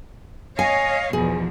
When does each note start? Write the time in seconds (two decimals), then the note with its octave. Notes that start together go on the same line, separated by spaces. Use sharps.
0.59 C#5 D#5 F5 G#5
1.13 E2 B2 F3 G#4